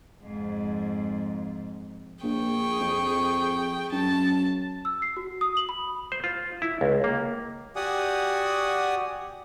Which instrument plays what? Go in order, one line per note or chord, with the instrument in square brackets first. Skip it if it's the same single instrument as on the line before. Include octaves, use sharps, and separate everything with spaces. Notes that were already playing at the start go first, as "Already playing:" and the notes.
[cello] F2 G#2
[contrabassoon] A#1 [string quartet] G#4 G5 C#6
[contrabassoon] F2
[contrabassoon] F#2 [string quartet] A5
[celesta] E6
C7
F#4
D#6
F#7
B5
[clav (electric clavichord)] C5
F4
E4
C#2
A#3
[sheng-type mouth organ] F#4 G4 D5 F#5 G#5 D#6